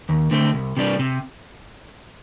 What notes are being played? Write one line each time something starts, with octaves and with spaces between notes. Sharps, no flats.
D#2
D3 A3 C4
C2
C3 G3 D4
C3